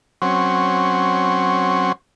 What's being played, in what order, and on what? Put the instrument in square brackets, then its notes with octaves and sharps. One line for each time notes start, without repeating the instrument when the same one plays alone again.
[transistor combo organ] F#3 C4 C#4